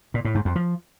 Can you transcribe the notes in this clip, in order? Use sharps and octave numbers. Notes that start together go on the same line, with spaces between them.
A#2
A2
G#2
F2
F3